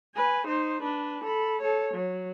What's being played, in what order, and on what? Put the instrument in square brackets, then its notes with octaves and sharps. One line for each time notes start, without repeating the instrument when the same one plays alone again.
[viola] B4 G#5
D#4 C5
D4 B4
A4 B5
A4 C#5
F#3